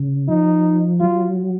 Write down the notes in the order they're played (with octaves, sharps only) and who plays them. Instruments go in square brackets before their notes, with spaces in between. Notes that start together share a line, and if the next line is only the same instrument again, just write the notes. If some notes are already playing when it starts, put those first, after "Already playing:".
Already playing: [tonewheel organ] C#3
[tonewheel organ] F3 [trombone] D#4
[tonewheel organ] F#3 [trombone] F4